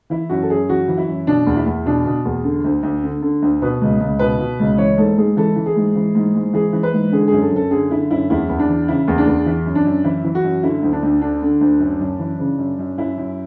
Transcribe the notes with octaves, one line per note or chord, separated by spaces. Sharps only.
E3 E4
F#2 F#4
A4
F#2 G#4
E3 F#4
E3
E4
F#2
B2 D4
E2
E4
E2
B2 D4
B2
E2
D3
D2
D2
D3
D3
D2
B2 B4
C#2
C#2
B2 B4
B2
C#2
E3 C#5
G#2 A4
G#2 G#4
E3 A4
E3
G#4
G#2
E3
G#2
G#2
E3 G#4
E3
B4
G#2
D3 G#4
F#2 G#4
A4
F#2 A4
D3 G#4
D3 E4
F#2 E4
E2 E4
E2
D4
E3
C#3 E4
E2
D4
E2
E3 E4
F#2
D4
F#2
E3 E4
E3
F#4
F#2
D3 E4
D2
D4
D2
D3 D4
D3
D2
F#2
F#2
E3
C#3
F#2
F#2
F#2 E4
F#2